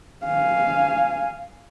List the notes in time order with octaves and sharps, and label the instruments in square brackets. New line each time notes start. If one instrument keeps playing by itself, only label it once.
[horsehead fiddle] F5 G#5